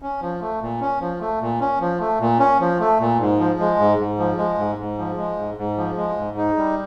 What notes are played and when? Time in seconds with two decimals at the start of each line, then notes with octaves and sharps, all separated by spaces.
0.02 C#4
0.22 F3
0.41 A3
0.62 A#2
0.81 C#4
1.01 F3
1.21 A3
1.41 A#2
1.60 C#4
1.80 F3
2.00 A3
2.20 A#2
2.39 C#4
2.60 F3
2.80 A3
3.00 A#2
3.19 G#2
3.39 F3
3.59 G#3
3.79 G#2
3.99 G#2
4.18 F3
4.38 G#3
4.58 G#2
4.78 G#2
4.98 F3
5.17 G#3
5.37 G#2
5.57 G#2
5.77 F3
5.97 G#3
6.17 G#2
6.37 D#4
6.57 G3